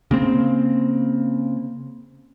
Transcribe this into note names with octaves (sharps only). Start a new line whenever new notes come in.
C#3 A#3 C4